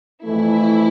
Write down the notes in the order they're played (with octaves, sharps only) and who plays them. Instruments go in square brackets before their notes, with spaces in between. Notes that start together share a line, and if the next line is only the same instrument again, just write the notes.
[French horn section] F2 E3 A3 [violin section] E4